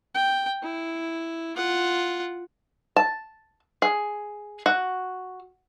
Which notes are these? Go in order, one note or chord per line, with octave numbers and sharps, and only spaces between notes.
G5
E4
F4 F#5
A5
G#4
F#4